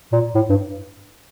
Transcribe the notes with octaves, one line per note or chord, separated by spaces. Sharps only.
A#2
A2
G2